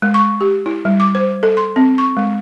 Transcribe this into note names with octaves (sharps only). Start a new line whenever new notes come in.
G#3
C#6
G4
E4
G3
D6
C5
A4
C6
C4
C#6
G#3